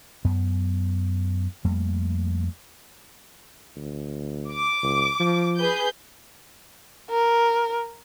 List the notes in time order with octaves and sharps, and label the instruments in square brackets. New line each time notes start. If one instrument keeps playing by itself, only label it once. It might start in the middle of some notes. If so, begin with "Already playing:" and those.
[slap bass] F#2 B3
F2 G3 A3 A#3
[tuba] D2
[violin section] D6
[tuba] C#2
F3
[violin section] G#4 B4 G6
[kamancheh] A#4